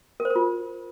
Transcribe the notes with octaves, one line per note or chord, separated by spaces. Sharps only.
A#4
C5
A#4
F4